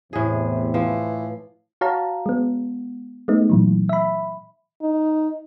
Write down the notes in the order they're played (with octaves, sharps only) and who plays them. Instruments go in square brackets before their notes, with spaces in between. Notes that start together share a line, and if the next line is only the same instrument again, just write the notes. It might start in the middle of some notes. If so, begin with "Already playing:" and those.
[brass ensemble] E2 C3 [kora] A2 G#4
[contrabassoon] E3 [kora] F3
[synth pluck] F#4 C#5 F5 A5 A#5
G#3 B3
G#3 A3 B3 D#4
A#2 E3 F#3
E5 B5
[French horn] D#4